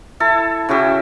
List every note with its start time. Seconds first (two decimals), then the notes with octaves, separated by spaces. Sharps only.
0.20 E4 A4
0.69 C#3 E4 F#4 G4